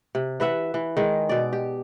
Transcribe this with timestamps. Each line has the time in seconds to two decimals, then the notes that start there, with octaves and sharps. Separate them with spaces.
0.15 C3
0.40 E3 B4 E5 F#5
0.74 E3
0.97 D#3 G#3
1.29 B2 D5
1.53 G4